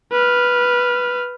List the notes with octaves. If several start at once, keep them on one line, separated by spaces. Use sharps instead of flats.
B4 F6